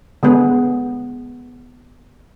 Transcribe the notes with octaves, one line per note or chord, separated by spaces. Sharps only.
D3 G#3 B3 G#4